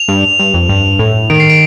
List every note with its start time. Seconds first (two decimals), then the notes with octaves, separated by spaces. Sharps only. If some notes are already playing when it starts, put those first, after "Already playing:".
Already playing: F7
0.08 G2
0.39 G2
0.54 F2
0.69 G2
0.99 A2
1.30 D#3 D7
1.40 C7
1.50 D7